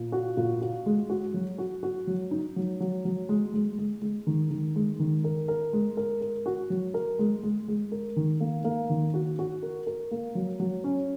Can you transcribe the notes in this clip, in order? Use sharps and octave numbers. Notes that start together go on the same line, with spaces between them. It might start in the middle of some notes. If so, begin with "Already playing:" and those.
Already playing: A#2
F#4
A#2
F#4
G#3
F#4
F#3
F#4
F#4
F#3
D#4
F#3
F#3
F#3
G#3
G#3
G#3
G#3
D#3
D#3
G#3
D#3
A#4
A#4
G#3
A#4
A#4
F#4
F#3
A#4
G#3
G#3
G#3
A#4
D#3
A#3
A#3
D#3
F#4
F#4
A#4
A#4
A#3
F#3
F#3
C#4